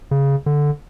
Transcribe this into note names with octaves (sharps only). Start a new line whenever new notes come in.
C#3
D3